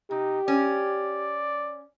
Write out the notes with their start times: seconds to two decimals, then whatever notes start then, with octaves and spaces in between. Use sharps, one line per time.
0.11 C3 D#4 G4
0.48 C#4 D5